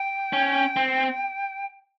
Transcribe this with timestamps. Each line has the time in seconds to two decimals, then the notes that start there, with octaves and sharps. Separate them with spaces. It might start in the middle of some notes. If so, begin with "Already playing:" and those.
Already playing: G5
0.33 C#4
0.77 C4